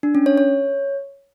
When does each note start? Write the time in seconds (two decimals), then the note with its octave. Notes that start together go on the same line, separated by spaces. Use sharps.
0.03 D4
0.15 C#4
0.26 C#5
0.38 C#5